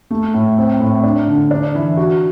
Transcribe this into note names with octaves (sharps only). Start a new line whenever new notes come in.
A3
A2
C4
A2
D4
D3
D4
E3
F#4